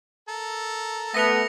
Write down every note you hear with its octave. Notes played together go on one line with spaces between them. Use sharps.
A4 A#4
A3 B3 A#6 C#7 F7